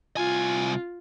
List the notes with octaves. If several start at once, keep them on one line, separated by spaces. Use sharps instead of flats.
C2 F4 G#5